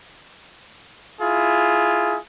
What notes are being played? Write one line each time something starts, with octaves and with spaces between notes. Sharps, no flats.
E4 F4 G#4